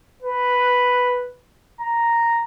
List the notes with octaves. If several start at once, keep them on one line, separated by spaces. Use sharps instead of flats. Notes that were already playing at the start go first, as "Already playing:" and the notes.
B4
A#5